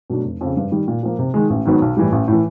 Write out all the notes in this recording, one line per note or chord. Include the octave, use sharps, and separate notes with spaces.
B2 F#3 A3 D4
F1
F2 C#3
G2
D#3 G3
A#2
F3 A#3
C3
D#3 G#3
A1
G#2 D#3 F#3 B3
B1
A2 E3 G3
A1
A2 E3